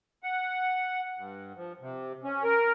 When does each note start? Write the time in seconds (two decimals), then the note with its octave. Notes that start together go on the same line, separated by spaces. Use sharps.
0.23 F#5
1.17 G2
1.56 F3
1.81 C3
2.24 C#4
2.44 A#4